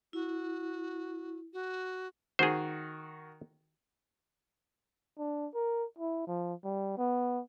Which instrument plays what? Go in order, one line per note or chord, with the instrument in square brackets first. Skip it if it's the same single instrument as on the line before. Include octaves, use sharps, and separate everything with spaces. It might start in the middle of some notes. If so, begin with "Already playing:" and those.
[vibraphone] E4 [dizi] F#4
[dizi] F#4
[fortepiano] D#3 F#4 [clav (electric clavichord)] G#4 C5
[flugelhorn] D4
A#4
E4
F3
G3
B3